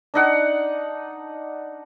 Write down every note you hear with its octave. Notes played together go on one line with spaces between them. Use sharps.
D4 D#4 F#5